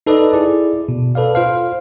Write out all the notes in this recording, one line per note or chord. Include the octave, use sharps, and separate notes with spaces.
D#4 A4 B4 D5 D#5
E4 G#4 D5
B2
A4 B4 D5 F5
F4 C5 F5